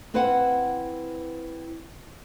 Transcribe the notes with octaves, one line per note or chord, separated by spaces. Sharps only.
C4 E4 B4 C5 F5 F#5